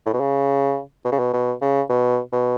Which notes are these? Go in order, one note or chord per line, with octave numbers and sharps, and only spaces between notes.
A2
B2
C#3
B2
C#3
B2
B2
C#3
B2
B2